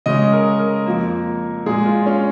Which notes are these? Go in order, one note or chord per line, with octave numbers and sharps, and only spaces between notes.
C#3 G#3 D#5
A#4
A#4
F2 F3 A#3
A#2 G#3 G#4
F4
C#4